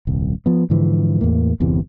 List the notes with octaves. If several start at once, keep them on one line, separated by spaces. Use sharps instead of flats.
D#1 C2
F3 B3
G#2 D3 E3 F3
E2 A2 A#3
G1 E2 C3 E3